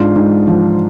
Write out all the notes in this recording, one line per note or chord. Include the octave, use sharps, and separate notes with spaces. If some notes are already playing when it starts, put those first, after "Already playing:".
Already playing: G#2 D4 F4
G#2
F3